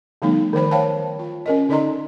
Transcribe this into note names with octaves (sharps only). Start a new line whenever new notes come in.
D3 F3 G3 A3 B3 D#4
D#3 F#3 C5 B5
C5 C#5 F5 G5 A5
F4
C#4 A#4 D#5
D3 D#4 D5 D#5 A#5 C6